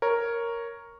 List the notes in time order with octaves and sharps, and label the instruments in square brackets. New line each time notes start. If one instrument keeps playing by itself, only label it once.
[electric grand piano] A#4 C#5